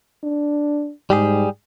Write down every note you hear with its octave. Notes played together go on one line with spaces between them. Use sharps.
D4
G#2 G3 G4 G#4